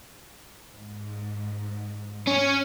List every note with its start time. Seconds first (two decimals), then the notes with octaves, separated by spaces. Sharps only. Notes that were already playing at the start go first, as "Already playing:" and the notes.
0.73 G#2
2.27 C#4